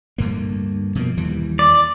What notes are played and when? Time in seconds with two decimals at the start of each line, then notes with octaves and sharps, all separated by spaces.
0.18 D2 G2 A#3
0.95 B2 F3 A#3
1.17 D#2 E3 G3
1.59 D5